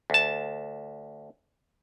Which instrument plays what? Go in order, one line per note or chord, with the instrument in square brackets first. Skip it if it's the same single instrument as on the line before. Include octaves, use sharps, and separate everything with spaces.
[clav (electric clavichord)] D2 A5